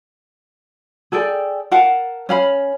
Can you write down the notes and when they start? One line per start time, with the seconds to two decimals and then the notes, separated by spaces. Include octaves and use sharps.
1.12 G#4 A4 D5 G5
1.71 A#4 F5 F#5 A5
2.29 C#4 F5 B5